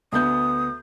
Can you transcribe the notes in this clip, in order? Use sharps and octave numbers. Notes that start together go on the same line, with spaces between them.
D2 B3 D#6 G6